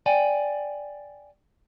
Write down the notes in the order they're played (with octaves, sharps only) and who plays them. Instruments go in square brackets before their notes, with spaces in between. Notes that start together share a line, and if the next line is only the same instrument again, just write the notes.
[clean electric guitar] D5 G5 G#5